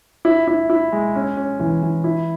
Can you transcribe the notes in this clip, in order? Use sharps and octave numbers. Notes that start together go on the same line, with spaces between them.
E4
E4
E4
G#3
C#4
C#4
E3
E3
E4